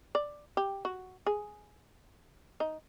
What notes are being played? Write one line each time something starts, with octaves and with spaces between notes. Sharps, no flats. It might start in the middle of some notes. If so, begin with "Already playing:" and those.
D5
G4
F#4
G#4
D#4